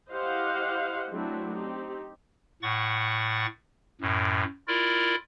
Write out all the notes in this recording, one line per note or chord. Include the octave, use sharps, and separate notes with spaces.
E4 G4 C5 D#5 F5 F#5
F#3 A3 C4 D4 E4 F#4
C4 D#4 G4
A2 F#5 C#6 A6
F#2 A2
E4 F4 A#4 D5